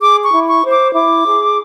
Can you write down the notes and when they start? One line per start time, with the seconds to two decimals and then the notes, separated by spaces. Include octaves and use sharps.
0.01 G#4 D6
0.24 C#6
0.32 E4
0.47 C#6
0.63 C5
0.71 D6
0.94 E4 D6
1.25 G#4